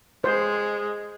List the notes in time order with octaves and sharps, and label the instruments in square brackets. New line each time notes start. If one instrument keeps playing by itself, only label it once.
[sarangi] G#3 [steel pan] C5